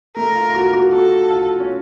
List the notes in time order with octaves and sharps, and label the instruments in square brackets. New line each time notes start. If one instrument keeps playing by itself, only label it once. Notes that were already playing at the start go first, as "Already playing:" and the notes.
[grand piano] A3 [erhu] A#4
[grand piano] F4
F4
F#4
F#4
[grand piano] F#4 [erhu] A4
[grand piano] F4
C#4